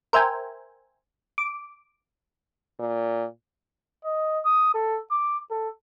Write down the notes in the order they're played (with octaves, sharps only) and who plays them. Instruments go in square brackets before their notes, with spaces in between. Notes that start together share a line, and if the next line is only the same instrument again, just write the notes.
[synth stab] A#4 C5 E5 G5 G#5
D6
[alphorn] A#2
[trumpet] D#5
D#6
A4
D6
A4